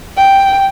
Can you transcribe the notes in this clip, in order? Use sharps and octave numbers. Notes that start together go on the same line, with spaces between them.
G5